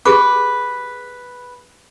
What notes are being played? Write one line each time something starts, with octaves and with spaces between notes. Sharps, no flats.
G4 G#4 B4 D6